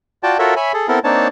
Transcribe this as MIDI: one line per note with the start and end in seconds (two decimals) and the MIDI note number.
0.23 0.38 65
0.23 0.38 66
0.23 0.38 74
0.23 0.38 79
0.23 0.38 81
0.39 0.54 65
0.39 0.54 66
0.39 0.54 69
0.39 0.54 70
0.39 0.54 73
0.39 0.54 76
0.56 0.72 73
0.56 0.72 76
0.56 0.72 80
0.56 0.72 83
0.74 0.88 68
0.74 0.88 69
0.88 0.99 59
0.88 0.99 60
0.88 0.99 64
0.88 0.99 69
0.88 0.99 70
1.04 1.28 58
1.04 1.28 60
1.04 1.28 62
1.04 1.28 63
1.04 1.28 73
1.04 1.28 81